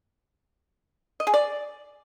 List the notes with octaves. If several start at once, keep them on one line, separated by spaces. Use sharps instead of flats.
D#5
G#4
D5